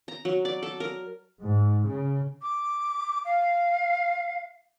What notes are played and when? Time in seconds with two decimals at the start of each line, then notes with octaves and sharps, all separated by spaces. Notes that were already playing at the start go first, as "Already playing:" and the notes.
0.08 A#5
0.25 F#3
0.45 D5
0.63 A4
0.80 A#4
1.40 G#2
1.87 C#3
2.42 D6
3.25 F5